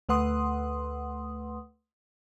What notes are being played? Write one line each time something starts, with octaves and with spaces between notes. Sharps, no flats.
D2 A3 B4 F#5 C6 D#6